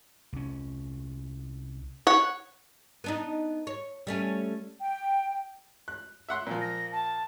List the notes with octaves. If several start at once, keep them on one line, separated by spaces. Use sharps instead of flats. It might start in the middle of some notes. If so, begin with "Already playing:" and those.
C2 C#4
C#5 F#5
B3 D4 D#4
C#5
G3 A3 C#4
G5
F#6
E5 F#5 C6
A#2 F3
A#6
A5